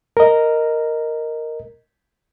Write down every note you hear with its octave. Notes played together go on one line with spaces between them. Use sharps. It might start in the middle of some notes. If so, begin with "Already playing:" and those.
A#4 D#5